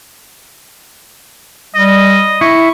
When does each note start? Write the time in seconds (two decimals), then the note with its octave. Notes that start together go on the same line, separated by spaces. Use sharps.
1.75 G3 D#5
2.41 E4 C#6